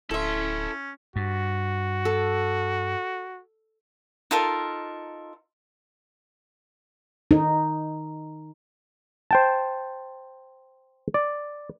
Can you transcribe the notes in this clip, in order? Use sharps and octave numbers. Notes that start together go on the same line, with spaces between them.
D1 C#4 E4 A4 E5 C6
G2 F#4
A4
D#4 F4 A4 A#4
D#4
C5 G5 A5
D5